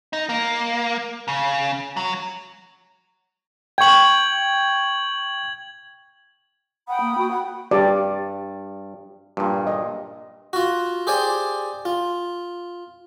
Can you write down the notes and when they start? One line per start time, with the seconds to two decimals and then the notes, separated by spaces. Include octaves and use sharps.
0.13 D#4
0.29 A#3
1.28 C#3
1.97 F#3
3.78 G5 C#6 G#6 F#7
6.88 F#5 G5 B5 D#6
7.00 A#3
7.17 F#4
7.30 F#5
7.71 G2 G4 D5
9.37 G2 A#2
9.67 D#5
10.53 F4 F#4
11.07 G4 G#4 C5 D5 G#5
11.85 F4